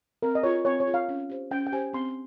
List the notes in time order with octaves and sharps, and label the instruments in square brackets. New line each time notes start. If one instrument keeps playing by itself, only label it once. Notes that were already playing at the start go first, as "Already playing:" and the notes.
[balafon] C4 [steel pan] A#4
[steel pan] D#5
[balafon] F4 G#4 [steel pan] C#5
[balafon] C4 [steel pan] C#5
[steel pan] C#5
[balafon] F4 G#4
[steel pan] F5
[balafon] C#4
G4 C5
[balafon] C#4 [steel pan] G5
[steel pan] G5
[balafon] G4 C5 [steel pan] G#5
[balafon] C4 [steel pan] C6